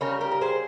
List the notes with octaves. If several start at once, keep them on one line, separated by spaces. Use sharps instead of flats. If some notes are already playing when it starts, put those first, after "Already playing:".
C#3 G3 A#4 C#5
G4 A#4
A#4
G#4 C5